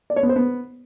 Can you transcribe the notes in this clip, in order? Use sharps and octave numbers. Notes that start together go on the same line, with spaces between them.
D5
C#5
B3
C5
B3